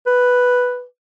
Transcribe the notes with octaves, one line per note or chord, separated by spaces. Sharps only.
B4